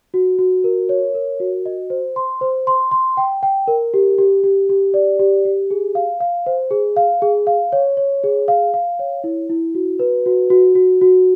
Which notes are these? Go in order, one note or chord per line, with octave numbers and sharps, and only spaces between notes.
F#4
F#4
A#4
C#5
A#4
F#4
D#5
C5
C6
C5
C6
C6
G5
G5
A#4
G4
G4
G4
G4
D5
G4
G4
G#4
F5
F5
C5
G#4
F5
G#4
F5
C#5
C#5
G#4
F5
F5
C#5
E4
E4
F#4
B4
F#4
F#4
F#4
F#4